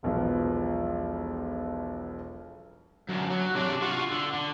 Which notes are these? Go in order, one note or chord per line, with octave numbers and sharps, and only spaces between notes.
E1 B1 F3 B3
F#2 D3
F#3
C3 D4
F4 F#4
D3
D3